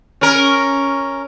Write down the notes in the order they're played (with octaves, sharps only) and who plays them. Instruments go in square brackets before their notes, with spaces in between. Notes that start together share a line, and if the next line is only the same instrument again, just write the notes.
[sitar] C#4 A#4